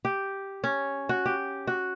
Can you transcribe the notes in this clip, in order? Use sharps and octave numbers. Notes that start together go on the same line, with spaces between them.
G4
C#4
F#4
G4
F#4